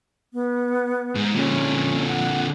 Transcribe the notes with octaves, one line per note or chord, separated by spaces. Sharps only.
B3
G#2
A#2 D3 C#4
F#5